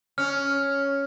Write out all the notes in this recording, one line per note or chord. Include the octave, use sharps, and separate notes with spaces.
C#4 F6